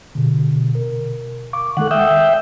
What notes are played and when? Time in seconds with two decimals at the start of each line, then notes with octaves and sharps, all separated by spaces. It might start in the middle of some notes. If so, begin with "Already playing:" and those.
0.15 B2 D3
0.75 A#4
1.53 F5 C#6 D6
1.77 D#3 G#3 A4 F#5
1.91 E5 G5 D#6